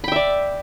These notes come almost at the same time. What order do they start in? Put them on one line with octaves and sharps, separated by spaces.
B5 G5 E5 D5